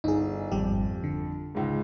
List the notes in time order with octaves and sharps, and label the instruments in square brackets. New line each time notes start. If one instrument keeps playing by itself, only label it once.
[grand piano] G1 [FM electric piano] D#4 G#4
[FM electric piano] G#1 G3 G4 [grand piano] F2
[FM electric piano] D3
[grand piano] C#2 G#2